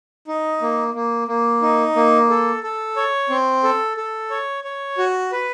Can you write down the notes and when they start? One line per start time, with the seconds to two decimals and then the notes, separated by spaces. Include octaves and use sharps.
0.28 D#4
0.62 A#3
0.94 A#3
1.28 A#3
1.62 D#4
1.96 A#3
2.30 A4
2.63 A4
2.96 C#5
3.30 C4
3.63 A4
3.97 A4
4.30 C#5
4.64 C#5
4.98 F#4
5.32 B4